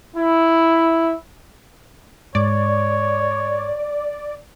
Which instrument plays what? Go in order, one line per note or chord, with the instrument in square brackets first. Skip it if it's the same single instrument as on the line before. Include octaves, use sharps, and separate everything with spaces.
[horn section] E4
[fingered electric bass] G#2 [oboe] C#5 [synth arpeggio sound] D5